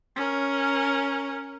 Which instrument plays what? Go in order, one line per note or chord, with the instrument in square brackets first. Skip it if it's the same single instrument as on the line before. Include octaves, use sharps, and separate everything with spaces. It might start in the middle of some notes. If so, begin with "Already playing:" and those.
[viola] C#4 A#4